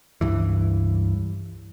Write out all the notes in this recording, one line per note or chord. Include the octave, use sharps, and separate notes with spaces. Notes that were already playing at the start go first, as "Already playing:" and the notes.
C#2 G2 E3